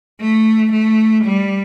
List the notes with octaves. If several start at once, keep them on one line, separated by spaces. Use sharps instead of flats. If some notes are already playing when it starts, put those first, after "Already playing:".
A3
A3
G3